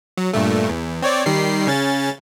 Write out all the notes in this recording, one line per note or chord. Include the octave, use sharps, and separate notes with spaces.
F#3
G2 A#2 A3
E2
C4 C#5 D5
D#3 G3 C7
C#3 C#4 A6